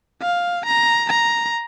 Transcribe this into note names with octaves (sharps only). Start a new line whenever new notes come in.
F5
A#5
A#5